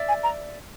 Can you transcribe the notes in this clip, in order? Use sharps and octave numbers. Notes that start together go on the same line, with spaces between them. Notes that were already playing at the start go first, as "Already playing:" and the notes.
Already playing: D5 E5
G#5
A#5